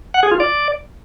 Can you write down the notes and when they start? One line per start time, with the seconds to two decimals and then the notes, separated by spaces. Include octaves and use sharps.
0.14 F#5
0.23 G#4
0.31 F4
0.40 D5